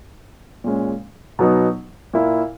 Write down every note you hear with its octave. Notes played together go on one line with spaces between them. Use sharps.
A#2 G#3 C#4
B2 F#3 B3 D#4
A#2 A#3 E4